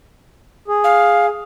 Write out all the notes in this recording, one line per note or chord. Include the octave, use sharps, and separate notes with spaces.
G#4
F5